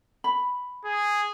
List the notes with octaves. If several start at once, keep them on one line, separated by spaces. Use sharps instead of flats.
B5
G#4